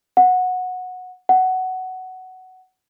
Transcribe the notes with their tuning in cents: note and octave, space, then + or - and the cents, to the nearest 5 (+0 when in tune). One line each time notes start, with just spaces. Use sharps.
F#5 -15
F#5 +10